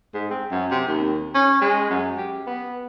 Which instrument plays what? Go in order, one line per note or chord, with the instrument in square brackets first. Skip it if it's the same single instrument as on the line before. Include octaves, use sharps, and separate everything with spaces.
[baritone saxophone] G#2
C4
F#2
C3
D#2
C#4
G#3
F#2
G4
B3